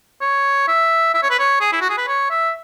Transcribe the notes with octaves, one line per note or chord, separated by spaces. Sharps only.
C#5
E5
E5
C#5
B4
C#5
G#4
E4
F#4
G#4
B4
C#5
E5